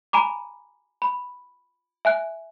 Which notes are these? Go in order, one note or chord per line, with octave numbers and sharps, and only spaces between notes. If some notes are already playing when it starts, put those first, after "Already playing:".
G#5 A#5 B5 D6
B5
E5 G#5 F#6